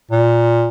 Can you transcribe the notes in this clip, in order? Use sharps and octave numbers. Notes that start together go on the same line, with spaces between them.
A#2